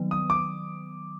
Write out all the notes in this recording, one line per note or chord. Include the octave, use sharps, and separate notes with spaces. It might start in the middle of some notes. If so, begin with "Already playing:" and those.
Already playing: D#3 F#3 B3
D#6
D6